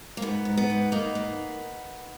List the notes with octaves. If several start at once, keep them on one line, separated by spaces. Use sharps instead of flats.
A#3
G#2 B3
G#2
B3
G#2
A#3 B3 D#4
A#3